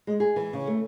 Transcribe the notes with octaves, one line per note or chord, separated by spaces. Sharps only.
G#3
G#4
E3
C#3
A3